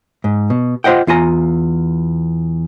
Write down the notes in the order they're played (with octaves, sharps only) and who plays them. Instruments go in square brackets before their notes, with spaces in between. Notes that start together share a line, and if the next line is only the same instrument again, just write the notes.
[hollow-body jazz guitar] G#2
B2
F4 C5 D#5 F#5 G5
E2 F4 G#5 A#5